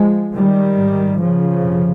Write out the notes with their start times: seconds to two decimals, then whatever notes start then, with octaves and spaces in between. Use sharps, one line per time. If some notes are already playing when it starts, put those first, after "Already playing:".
Already playing: F3 G#3
0.33 D#3 G3
0.76 G#2
1.18 C#3 F3
1.60 F2 C3